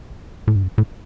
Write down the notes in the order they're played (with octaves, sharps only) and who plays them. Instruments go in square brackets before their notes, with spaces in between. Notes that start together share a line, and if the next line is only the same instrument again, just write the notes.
[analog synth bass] A2
G2
F#2
A2